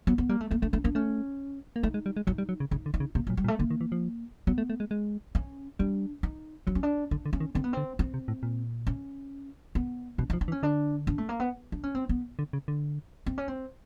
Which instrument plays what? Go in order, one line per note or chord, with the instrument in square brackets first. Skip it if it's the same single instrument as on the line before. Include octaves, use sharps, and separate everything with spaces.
[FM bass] F#3 [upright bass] B3
[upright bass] B3
[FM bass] G3 [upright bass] A#3
[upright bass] A3
[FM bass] A3 [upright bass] A#3
[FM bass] A3 [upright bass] D4
[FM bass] A3 [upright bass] D4
[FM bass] A#3 [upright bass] D4
[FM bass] A3 [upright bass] C#4
[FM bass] A#3
[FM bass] A3 [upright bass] D#4
[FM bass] G#3
G3
G#3
[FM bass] F#3 [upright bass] D#4
[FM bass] G3
F#3
C#3
[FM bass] C#3 [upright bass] D#4
[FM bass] D3
[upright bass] D#4
[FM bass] C#3
[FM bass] C3 [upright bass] A#3
[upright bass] F#3
[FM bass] A#2
[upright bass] G3
[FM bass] A#2
[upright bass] A3
[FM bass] D3 [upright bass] A#3
[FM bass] D#3
E3
F3
[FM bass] F#3 [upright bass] B3
[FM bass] A3
A3
G#3
G#3
[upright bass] C#4
[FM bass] G3 [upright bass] D4
[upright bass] D#4
[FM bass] F#3 [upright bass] D4
[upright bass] C#4
D4
[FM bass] D3 [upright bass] D4
[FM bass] D3
[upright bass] C#4
[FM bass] D#3
[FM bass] D3 [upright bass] C4
[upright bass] B3
[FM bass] D3 [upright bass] C4
[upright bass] C4
[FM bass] C3
A2
A#2
[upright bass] C#4
B3
[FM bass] B2 [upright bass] D4
[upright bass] D#4
[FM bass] F3
[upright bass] D4
[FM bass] E3
[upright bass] C#4
[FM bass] D3 [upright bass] D4
[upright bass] D4
A3
A#3
B3
D4
C#4
C4
B3
[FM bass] D3
C#3
D3
[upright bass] C4
C#4
C4